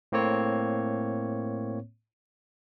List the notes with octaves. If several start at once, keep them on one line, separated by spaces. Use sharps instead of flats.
A2 A#3 C4 C#5